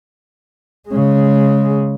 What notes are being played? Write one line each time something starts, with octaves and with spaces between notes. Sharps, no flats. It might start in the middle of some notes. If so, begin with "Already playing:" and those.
C#3 G#3